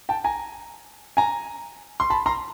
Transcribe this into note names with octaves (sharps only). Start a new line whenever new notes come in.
G5 A5
G#5 A#5
G#5 A#5
C6
A5 B5
A#5 C6